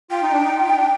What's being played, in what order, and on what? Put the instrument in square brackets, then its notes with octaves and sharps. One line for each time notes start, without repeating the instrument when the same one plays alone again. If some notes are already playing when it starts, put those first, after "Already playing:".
[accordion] F4 [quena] G5
[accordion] D#4
D4
D#4
F4
D#4
D4